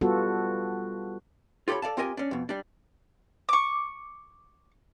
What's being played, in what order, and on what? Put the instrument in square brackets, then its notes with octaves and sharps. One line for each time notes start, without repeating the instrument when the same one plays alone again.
[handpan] G3 B3 F4 F#4 A4
[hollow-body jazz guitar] F4 G4 A4 C#5 B5
A4 D5 F5 A5
C4 F4 G4 A#4 D#5 G#5
C#4 D4
F2 B2
G3 D4
[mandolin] C#6 D6